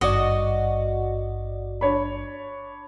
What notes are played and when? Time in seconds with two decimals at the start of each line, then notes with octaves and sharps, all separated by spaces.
0.01 G#1 G2 F#4 D5 D#5
1.81 D4 C#5 B5